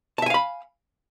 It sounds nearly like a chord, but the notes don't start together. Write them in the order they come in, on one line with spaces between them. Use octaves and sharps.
A5 E5 G#5 F5 B5